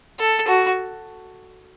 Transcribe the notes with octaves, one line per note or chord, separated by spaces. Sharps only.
A4
F#4